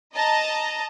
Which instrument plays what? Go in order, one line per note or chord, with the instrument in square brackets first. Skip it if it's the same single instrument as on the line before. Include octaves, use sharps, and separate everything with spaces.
[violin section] D#5 A5 A#5